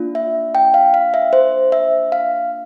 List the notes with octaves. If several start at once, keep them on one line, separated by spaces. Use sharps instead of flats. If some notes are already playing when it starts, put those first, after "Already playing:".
Already playing: A#3 D4 F4
E5
G5
F5
F5
E5
C5
E5
F5